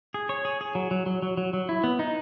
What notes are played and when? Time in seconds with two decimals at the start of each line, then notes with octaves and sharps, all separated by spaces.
0.14 G#4
0.29 C#5
0.45 G#4
0.61 G#4
0.75 F#3
0.91 F#3
1.06 F#3
1.22 F#3
1.37 F#3
1.53 F#3
1.69 E4
1.84 B3
1.99 D#4